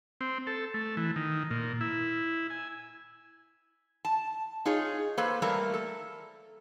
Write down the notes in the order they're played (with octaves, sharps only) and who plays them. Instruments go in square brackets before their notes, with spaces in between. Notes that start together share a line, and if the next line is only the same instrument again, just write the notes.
[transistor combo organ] C4
A4
A3
E3
D#3
A#2
E4
G#5
[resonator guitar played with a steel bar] A5
D#4 F4 G#4 C#5
A#3 A4 B4 C5
G3 A3 A#3 A4 A#5
A4